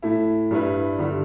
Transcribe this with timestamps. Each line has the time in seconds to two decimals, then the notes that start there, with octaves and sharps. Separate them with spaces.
0.02 A2 A3 E4
0.51 G2 G3 E4 B4
0.99 G2 D3 G3